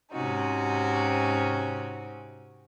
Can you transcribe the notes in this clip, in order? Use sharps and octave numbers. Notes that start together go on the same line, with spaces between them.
G#2 C3 C4 C#4 D#4 F#4